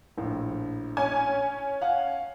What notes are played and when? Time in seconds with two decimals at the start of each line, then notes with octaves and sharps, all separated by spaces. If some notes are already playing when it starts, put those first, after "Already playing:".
0.17 A#1 A2
0.97 C#4 G#5
1.82 F5 F#5